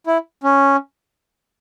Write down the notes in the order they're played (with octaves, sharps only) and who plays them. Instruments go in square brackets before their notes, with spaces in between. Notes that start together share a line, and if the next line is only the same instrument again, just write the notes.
[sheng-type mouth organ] E4
C#4